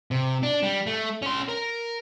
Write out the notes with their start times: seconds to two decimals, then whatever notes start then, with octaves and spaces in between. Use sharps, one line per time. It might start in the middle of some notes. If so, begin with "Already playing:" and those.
0.11 C3
0.43 D4
0.63 G3
0.87 A3
1.22 C#4 C6
1.49 A#4